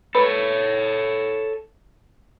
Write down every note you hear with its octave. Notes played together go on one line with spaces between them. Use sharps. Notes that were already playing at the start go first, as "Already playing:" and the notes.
A4 B4 C#5 B5